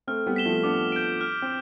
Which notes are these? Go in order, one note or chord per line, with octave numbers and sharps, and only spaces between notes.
A3 C4 F6
G3 B3
B6 E7 G7
F3 A3
B3 D4 D6
G6 D7
F6
C4